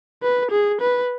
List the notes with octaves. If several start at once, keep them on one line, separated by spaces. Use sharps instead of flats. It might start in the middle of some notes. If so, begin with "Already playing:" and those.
B4
G#4
B4